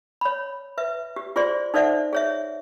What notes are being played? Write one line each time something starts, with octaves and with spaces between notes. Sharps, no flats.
C#5 B5
B4 E5
G4
F4 G#4 C5 D5 C6
D#4 A4 C5 D5 E5 F#5
G#4 C#5 E5